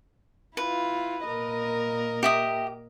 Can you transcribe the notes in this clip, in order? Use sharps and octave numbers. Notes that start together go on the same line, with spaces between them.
E4 F4 B4
A#2 A#4 D#5
G4 E5 D#6